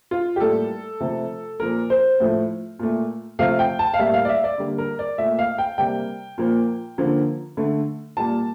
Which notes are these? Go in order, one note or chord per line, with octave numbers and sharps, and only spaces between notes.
F4
G4
A2 G3 A#3 A4
C3 F3 A3
A#2 F3 A#3 A#4
C5
A2 F3 A3
A#2 A3
C3 F3 A3 F5
G5
A5
F5
A2 G3 A#3 E5
F5
D5
E5
D5
D3 G3 A#3
A#4
D5
A#2 A3 E5
F5
G5
C3 G3 A#3 G5
A#2 F3 A#3
D3 F3 A#3
D3 A3
A#2 G3 A#3 A5